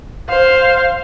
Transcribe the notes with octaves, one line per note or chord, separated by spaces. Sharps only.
C5 F5